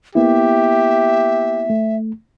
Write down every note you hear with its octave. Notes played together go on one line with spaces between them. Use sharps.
A#3 B3 E4 G4 E5
A3